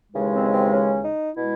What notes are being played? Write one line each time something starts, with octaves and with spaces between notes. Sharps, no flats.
D#2 C#3 E3 G#3
C4
C4
C#4
D#4
B2 G#3 E4